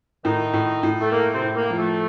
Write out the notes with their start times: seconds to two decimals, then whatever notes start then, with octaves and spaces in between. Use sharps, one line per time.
0.25 A2 D#3 D#4
0.53 A2
0.83 A2
1.01 A3
1.12 A3 A#3
1.34 C3 C4
1.42 A2
1.56 A#3
1.70 F3
1.78 A3